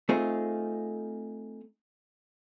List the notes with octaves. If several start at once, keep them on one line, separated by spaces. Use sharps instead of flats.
A3 C4 D#4 F4 G#4